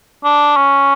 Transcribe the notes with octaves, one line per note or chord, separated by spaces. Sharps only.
D4
C#4